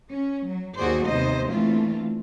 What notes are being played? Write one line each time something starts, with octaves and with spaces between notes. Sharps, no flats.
C#4
F#3
D#2 D#3 F#4 G#4 C5 D5
D#2 C3 B3 D#4 C5 D#5
E3 A3 A#3 C4 D4 F4